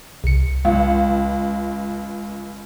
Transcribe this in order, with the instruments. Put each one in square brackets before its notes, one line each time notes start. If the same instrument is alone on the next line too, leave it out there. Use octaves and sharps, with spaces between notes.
[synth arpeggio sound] C2 C#7
[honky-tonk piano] C#2